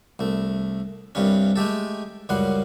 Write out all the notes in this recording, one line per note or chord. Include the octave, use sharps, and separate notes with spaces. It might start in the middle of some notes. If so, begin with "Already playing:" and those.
C2 A3
C2 G2 C3 C#4
G#3 A3 G4 A4
C#2 F#2 G3 F#5 C6